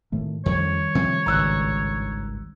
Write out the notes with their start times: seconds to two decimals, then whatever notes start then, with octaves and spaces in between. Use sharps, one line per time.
0.12 A2 D#3 A3
0.46 F2 D#3 G3 C#5
0.95 C3 F3 C4
1.26 G#1 C#2 G2 A#5 E6 F#6